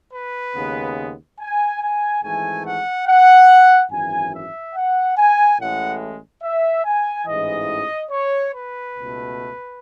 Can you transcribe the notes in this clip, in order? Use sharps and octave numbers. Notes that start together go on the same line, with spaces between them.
B4
D#2 C#3 G#3 B3
G#5
G#5
G#1 G#2 E3 A3 G#5
F#5
F#5
G#1 F#2 E3 G#5
E5
F#5
G#5
A1 A2 G#3 F#5
E5
G#5
A1 G#2 E3 D#5
C#5
B4
C#2 B2 A3